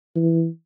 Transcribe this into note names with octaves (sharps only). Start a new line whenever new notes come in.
E3